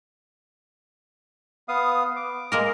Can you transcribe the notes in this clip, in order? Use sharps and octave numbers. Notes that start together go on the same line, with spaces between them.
B3 F5 D#6
D6
G#3 A#3 A#4